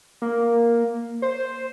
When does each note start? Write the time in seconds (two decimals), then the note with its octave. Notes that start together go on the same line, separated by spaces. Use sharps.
0.22 A#3
1.22 C5